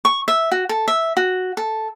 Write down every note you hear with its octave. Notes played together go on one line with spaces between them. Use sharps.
C#6
E5
F#4
A4
E5
F#4
A4